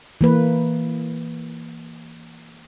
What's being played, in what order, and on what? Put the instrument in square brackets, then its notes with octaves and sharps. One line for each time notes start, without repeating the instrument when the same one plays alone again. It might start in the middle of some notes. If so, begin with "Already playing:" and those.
[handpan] E3 A#3 B4